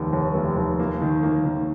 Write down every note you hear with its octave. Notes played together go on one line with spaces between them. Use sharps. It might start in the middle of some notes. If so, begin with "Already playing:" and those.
Already playing: F1 D#2 D#3
D#2
F1
D#2
A#3
D#3
A#3
D#3